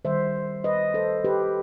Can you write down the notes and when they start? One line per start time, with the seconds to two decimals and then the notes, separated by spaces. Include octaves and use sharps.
0.05 D#3 G3 C5 E5
0.64 B4 D#5
0.94 A4 C5
1.24 G4 B4